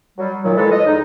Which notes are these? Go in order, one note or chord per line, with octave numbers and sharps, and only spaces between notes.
F#3 G3
A#2 D#3 F#3
E3 F3 G#3 A4
D#5
E2 D3 D#4